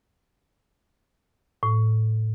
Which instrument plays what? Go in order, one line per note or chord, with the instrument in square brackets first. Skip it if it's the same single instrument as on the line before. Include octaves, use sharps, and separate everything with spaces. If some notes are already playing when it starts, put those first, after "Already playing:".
[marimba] A2